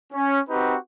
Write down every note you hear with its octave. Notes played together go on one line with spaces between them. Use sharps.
C#4
C4 D#4 F#4 G4 B4